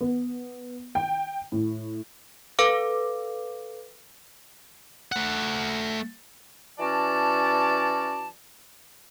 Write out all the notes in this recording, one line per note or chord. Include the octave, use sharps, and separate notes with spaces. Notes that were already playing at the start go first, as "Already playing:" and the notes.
B3
G5
A2
A4 B4 F5 D6
A3 F#5
E3 C#4 F#4 D5 A5